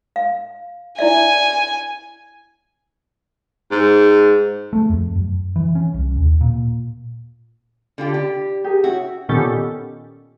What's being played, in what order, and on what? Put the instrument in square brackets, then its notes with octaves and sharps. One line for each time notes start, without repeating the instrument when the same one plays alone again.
[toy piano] F5
[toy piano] E4 D5 E5 [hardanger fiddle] G#5
[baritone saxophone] G#2
[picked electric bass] A3
F2
F#2
E3
C#4
C2
D#2
A#2
[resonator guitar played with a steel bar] D3 F4 G4
[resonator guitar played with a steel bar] G4 [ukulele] D5 B5
[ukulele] G4 G#4 A#4
[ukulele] C#4 E4 [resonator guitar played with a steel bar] F#4
[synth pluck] A#2 D#3 B3 C#4 G4 A4